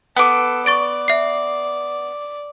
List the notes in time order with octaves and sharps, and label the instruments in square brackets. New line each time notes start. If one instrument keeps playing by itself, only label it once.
[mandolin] B3 D6 [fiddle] A4
[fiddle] D5 [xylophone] C#6 A6 D7
[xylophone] E5 C7